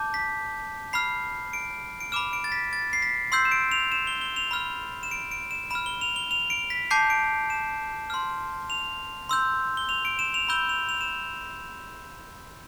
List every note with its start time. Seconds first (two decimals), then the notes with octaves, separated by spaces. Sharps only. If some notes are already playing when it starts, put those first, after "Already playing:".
Already playing: A5 D6 G6
0.14 B6
0.93 B5 F6 C7
1.53 D7
2.01 D7
2.12 B5 D6 F6 E7
2.33 D7
2.44 A6
2.52 B6
2.73 A6
2.93 C7
3.02 B6
3.32 C6 E6 G6 C7
3.45 E7
3.51 D7
3.71 F7
3.92 E7
4.07 G7
4.21 G7
4.36 F7
4.51 B5 F6
5.03 E7
5.11 D7
5.31 D7
5.51 E7
5.70 B5 F6 E7
5.86 G7
6.01 F7
6.16 G7
6.31 F7
6.50 D7
6.70 B6
6.91 A5 D6 G6 C7
7.10 D7
7.50 E7
8.10 C6 F6
8.70 F7
9.29 C6 E6 G6
9.77 G7
9.89 F7
10.05 D7
10.19 E7
10.34 F7
10.49 B5 E6 G6 G7
10.69 F7
10.89 F7
11.01 E7